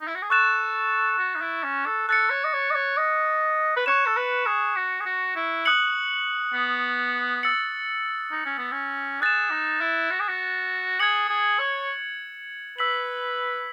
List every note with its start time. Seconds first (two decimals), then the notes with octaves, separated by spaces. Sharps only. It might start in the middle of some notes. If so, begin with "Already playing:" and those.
0.01 D#4
0.08 E4
0.15 F#4
0.22 G#4
0.29 A4 C#6 F#6 A6 E7
1.19 F#4
1.36 D#4
1.41 E4
1.64 C#4
1.86 A4
2.08 A4 F#6 A6 C#7
2.30 C#5
2.44 D#5
2.53 C#5
2.71 D#5
2.75 C#5
2.97 D#5
3.76 B4
3.86 C#5 C#6 F#6 C#7 E7
4.06 A4
4.17 B4
4.46 G#4
4.76 F#4
5.00 G#4
5.06 F#4
5.36 E4
5.65 D#6 F#6 C#7 F#7
6.53 B3
7.43 E6 A6 C#7 F#7
8.32 D#4
8.45 C#4
8.58 B3
8.72 C#4
9.21 G#4 F#6 A6 E7
9.50 D#4
9.81 E4
10.11 F#4
10.20 G#4
10.28 F#4
11.00 G#4 G#6 C#7 F#7
11.29 G#4
11.59 C#5
12.78 B4 E6 B6 F#7